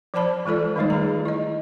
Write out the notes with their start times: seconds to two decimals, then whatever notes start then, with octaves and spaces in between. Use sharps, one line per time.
0.14 F3 C5 D5 A5 B5
0.46 E3 G#3 F4 A4 D5
0.76 D#3 G3 A3 D#4 C#5
0.90 G#4 A#5
1.25 E4 D#5